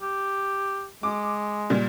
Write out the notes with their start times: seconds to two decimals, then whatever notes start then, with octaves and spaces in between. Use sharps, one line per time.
0.02 G4
1.03 G#3 D6
1.70 A#2 G3